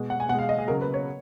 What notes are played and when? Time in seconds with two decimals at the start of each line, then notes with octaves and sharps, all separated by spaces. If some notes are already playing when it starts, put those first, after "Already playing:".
Already playing: B2 G#3
0.10 F#5
0.20 G#5
0.29 B2 F#5
0.34 G#3 F5
0.49 D#5
0.58 G#4
0.67 C#3 F#3 A#4
0.81 B4
0.94 C#5